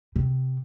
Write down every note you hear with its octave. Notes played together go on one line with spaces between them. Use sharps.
C3